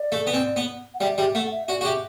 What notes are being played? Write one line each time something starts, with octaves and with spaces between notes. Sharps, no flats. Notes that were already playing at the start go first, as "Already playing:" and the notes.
Already playing: D5
A3
B3
C4
B3
F#5
G3 E5
G3 E5
A3 F#5
E5
F#4 D5
F#4
G4 E5